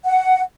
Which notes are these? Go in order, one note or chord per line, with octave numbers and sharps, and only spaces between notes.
F#5